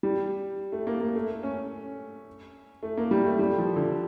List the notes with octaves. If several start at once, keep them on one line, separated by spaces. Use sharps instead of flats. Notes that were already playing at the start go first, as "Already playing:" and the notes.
G3
A3
A#3
A#3
A3
C#4
A3
A#3
G3
A3
G3
F3
D3